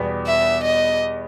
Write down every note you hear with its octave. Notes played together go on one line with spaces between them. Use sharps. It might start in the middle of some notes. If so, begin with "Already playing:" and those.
Already playing: E2 B2 G3 B3
E5
D#5